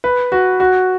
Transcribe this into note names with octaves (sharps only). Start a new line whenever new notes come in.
B4
F#4
F#4